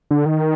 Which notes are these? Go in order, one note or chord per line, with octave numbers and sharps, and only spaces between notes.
D3
D#3